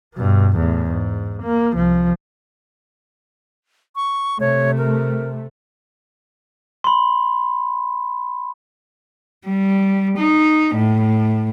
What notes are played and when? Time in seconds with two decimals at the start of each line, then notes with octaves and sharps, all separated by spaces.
0.15 G2 B2
0.56 E2 A2
0.89 G#2
1.43 A#3
1.74 C2 F3
3.96 C#6
4.40 C3 A3 C#5
4.78 A#4
6.84 B5 C6
9.46 G3
10.18 D#4
10.75 A2